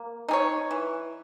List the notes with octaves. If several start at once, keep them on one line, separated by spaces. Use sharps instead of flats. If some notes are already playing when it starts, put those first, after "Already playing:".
Already playing: A#3
D#4 G#4 C#5
E3